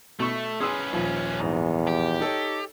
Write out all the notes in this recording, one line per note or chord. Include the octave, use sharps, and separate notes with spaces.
B2 A3 C#6
C#4 G#4 B4 C6 E6
D#1 A#1 F3
E2 G#2
G4
D#4 A4 C#5